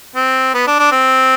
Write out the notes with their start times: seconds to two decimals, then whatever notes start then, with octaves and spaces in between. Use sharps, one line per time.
0.16 C4
0.54 B3
0.67 D4
0.79 D4
0.92 C4